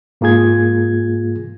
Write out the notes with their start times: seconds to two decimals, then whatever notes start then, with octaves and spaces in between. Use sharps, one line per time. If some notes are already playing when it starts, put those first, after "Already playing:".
0.21 G#2 A#3 F4 G#4 G#6